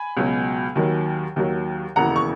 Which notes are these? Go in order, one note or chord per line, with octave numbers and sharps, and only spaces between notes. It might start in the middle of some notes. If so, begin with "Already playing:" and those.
Already playing: G#5 B5
C#2 B2 F#3
D#2 D#3 F#3
D#2 D#3 F#3
E1 D#2 C#3 E3 F#5 A#5
C#6